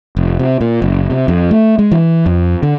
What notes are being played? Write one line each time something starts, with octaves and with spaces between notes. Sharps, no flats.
F1
C3
A#2
F#1
C3
F2
A3
G#3
E3
F2
D3